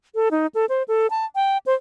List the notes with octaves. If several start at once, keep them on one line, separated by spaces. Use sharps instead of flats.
A4
D#4
A4
C5
A4
A5
G5
C5